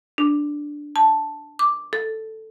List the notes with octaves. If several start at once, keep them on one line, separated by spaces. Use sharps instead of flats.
D4
A5
D6
A4